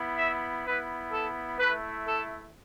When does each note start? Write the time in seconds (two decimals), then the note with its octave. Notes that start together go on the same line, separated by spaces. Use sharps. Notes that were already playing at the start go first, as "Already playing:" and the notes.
Already playing: B3 E4
0.18 E5
0.65 B3 E4 B4
1.13 A4
1.58 A3 E4 B4
2.06 A4